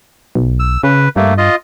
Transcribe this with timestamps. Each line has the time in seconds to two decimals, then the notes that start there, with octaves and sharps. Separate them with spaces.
0.35 B1
0.59 E6
0.83 C#3 B4
1.16 G2 A3 A#3
1.38 F4 D#5